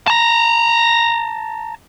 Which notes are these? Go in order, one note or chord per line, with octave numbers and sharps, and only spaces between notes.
A5 A#5